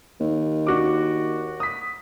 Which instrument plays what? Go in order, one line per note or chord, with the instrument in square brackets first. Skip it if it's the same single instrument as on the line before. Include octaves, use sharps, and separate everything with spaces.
[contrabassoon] D#2
[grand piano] D4 F#4 D6
D#6 B6